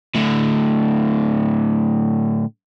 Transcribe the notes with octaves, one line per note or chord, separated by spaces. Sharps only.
A2 D3